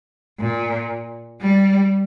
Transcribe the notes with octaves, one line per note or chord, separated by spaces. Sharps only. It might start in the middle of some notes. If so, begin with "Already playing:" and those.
A#2
G3